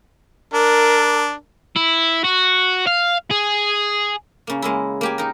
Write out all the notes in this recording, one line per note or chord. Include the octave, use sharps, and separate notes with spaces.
D4 A#4
E4
F#4
F5
G#4
C#3 A#3
G#3 A#3 E4
A#3 G4 G#5
D#4 A#4